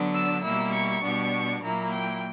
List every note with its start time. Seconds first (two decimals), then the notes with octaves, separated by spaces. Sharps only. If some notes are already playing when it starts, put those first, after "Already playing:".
Already playing: D3 F#3 B3 D4
0.13 E6
0.43 B2 G3 A#3 E4 E6
0.73 C#6
1.02 B2 G3 B3 D4
1.62 A#2 F#3 A#3 E4 A#5
1.91 G5